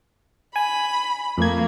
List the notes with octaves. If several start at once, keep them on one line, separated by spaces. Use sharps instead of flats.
G#5 B5
F2 A3 A#3 G#6